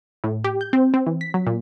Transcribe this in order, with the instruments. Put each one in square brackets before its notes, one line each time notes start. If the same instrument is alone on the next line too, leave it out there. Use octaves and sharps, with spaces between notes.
[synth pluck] A2
G4
G6
C4
C4
E3
B6
F#3
A#2